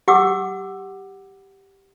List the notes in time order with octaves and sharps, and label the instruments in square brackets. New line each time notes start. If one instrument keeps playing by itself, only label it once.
[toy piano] G4 F#5 D6 E6